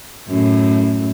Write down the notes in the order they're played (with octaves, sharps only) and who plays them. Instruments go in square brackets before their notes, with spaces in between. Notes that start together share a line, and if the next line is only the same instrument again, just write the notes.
[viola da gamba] F#2 A2